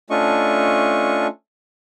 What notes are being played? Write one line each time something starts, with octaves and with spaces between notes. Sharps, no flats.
A3 C#4 D4 F4 D#5 C#6